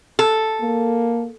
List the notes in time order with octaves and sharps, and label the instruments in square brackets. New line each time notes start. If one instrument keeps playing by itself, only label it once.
[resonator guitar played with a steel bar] A4
[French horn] A#3